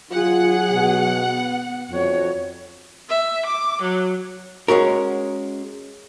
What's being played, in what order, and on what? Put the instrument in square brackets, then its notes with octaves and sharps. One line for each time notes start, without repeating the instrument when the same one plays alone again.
[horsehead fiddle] F#3 G#4 [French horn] F4 [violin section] F#5
[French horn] B2
[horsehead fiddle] B3
[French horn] F2 [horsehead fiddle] F#4 C#5
[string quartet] E5
D6
F#3
[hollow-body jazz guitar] G#3 C#4 F#4 A#4